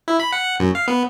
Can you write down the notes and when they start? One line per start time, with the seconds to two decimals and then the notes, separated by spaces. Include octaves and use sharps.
0.08 E4
0.20 B5
0.32 F#5
0.45 F#5
0.60 F#2
0.75 F5
0.88 B3